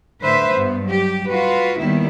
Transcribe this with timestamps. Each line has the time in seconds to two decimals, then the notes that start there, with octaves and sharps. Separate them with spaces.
0.21 A2 D3 B4 C5 E5
0.52 G2 B3
0.84 F#3 G4
1.28 F4 F#4 B4
1.78 D#2 D#3 G3 B3 E4